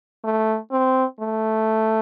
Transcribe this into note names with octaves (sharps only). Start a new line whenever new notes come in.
A3
C4
A3